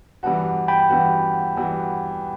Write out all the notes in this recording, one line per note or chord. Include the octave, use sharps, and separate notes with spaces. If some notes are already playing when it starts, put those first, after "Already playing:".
E3 G3 B3 F#4 F#5 A5
G5 B5
E3 G3 B3 F#4
E3 G3 B3 F#4